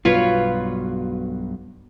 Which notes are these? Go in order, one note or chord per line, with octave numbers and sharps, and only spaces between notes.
B1 G2 B2 F4 B4 C#5